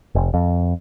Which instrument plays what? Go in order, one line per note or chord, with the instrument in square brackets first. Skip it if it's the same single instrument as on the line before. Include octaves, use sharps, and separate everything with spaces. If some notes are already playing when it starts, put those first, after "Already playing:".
[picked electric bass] F1
F2